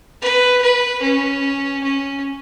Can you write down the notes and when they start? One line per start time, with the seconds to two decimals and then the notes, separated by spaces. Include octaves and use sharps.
0.21 B4
0.62 B4
1.02 C#4
1.83 C#4